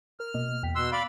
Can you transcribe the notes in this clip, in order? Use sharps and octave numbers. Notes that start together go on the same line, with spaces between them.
A#4 F6
B2 A#3 D#5
E2 G5 B6
B2 C6 E6 F#6
D5 F5 B5 D7